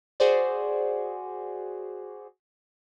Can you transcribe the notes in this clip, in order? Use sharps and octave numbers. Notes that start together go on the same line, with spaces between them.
F#4 G#4 C5 D5